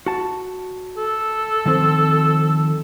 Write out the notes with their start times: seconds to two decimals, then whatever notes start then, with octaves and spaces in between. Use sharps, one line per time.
0.06 F#4 A5
0.97 A4
1.66 D#3 F3 C4